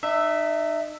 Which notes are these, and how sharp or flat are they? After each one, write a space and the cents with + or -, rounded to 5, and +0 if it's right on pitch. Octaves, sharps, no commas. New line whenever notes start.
D#4 -40 E5 +0 D#6 +0